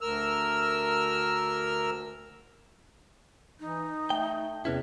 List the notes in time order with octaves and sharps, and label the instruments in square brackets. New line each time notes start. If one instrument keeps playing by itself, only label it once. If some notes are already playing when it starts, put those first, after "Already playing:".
[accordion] D2 A#4 E6 F6
[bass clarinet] E3 [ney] D#4
[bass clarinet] A3 [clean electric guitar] G5
[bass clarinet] E2 [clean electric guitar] C3 C#4 E4 [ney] B4